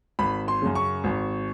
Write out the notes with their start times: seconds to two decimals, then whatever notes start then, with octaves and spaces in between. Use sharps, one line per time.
0.19 G#1 B5
0.48 C6
0.62 F#2 C#3
0.75 C#6
1.04 G#1